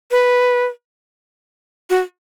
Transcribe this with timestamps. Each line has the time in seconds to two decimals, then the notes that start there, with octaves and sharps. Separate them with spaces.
0.11 B4
1.90 F#4